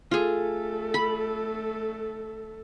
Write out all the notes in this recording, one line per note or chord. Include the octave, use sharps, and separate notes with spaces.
A3 F4 G#4 A4
B5